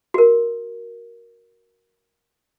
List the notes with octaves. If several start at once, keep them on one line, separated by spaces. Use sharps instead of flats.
F#4 A#4